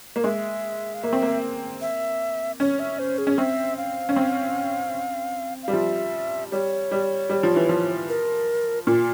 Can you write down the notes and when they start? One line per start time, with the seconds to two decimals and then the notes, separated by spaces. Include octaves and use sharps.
0.16 A#3
0.24 G#3 E5
0.94 F5
1.03 A#3 E5
1.13 C4
1.22 A#3
1.81 E5
2.60 C#4 C#5
2.79 E5
2.99 C5
3.18 G#4
3.27 C#4
3.38 C4 E5
3.77 F5
4.09 C#4
4.16 C4
5.63 G3 F5
5.73 F3 E5
6.52 G3 C#5
6.91 G3
7.30 G3
7.43 F3
7.56 E3
7.69 F3
8.08 A#4
8.87 A#2 F4